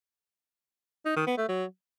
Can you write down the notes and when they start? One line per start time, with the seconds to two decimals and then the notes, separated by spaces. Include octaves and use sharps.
1.05 D#4
1.16 D#3
1.27 B3
1.38 A3
1.49 F#3